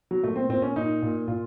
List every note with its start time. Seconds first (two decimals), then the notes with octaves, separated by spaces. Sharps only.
0.11 F#3
0.23 A#2 A3
0.36 C4
0.49 A#2 C4
0.62 C#4
0.76 A#2 D#4
1.02 A#2
1.28 A#2 F4